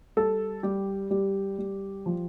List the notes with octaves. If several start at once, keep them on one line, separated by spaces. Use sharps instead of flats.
G3 A4
G3 G4
G3
G3
F3